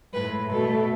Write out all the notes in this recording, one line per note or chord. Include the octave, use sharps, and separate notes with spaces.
A2 G#3 B4
B2 A3 A4